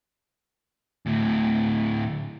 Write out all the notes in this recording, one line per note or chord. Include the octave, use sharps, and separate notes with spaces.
D2 A2